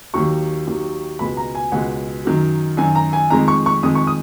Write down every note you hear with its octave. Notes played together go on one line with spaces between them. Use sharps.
D#2 D#3 F#3 C#6
D#2 D#3 F#3
C#2 B2 G#3 B5
A#5
G#5
C#2 B2 G#3 F#5
F#2 D#3 F#3
F#2 D#3 F#3 G#5
A#5
G#5
F2 D#3 G#3 A#5
C#6
C#6
F2 D#3 G#3 D#6
C#6
D#6